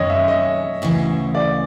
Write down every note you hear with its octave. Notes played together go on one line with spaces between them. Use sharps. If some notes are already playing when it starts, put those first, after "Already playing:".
Already playing: F#2 D#3 G#3 C#4 C#5 D#5
E5
D#5
D2 C#3 E3
D5